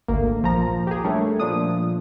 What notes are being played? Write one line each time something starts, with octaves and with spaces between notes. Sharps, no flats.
G#1 D2 A#3
A#1 F3 A#5
G4 G#4
G3 A3 D4 A4 A#4 C#5
A#2 F3 D4 D#6